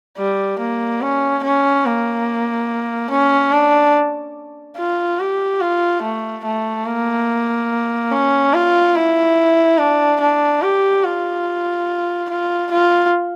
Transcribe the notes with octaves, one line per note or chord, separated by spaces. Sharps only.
G3
A#3
C#4
C#4
A#3
C#4
D4
F4
G4
F4
A3
A3
A#3
C#4
F4
E4
D4
D4
G4
F4
F4
F4